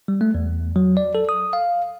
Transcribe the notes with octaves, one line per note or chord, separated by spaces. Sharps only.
G3
A3
E2
F#3
D5
A4
D#6
F5